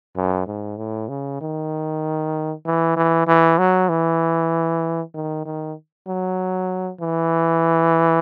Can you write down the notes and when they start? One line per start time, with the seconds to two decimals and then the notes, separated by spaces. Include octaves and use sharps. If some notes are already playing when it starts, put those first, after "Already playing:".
0.16 F#2
0.47 G#2
0.77 A2
1.08 C#3
1.41 D#3
2.65 E3
2.96 E3
3.27 E3
3.58 F#3
3.89 E3
5.14 D#3
5.45 D#3
6.07 F#3
7.00 E3